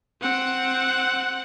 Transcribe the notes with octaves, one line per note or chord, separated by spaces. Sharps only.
C4 F#5